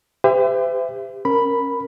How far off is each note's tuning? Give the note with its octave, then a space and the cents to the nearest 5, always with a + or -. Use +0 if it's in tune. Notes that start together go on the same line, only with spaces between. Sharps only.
G4 +30 C5 -45 E5 +25
C#4 -25 A#4 +0 B5 +0